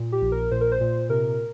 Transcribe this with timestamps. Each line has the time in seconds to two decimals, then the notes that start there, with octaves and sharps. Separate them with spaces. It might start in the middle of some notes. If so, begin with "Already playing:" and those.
Already playing: A#2
0.12 G4
0.22 A#1
0.32 A#4
0.51 A#2 C5
0.61 A#4
0.72 C5
0.81 A#2
1.10 C3 A#4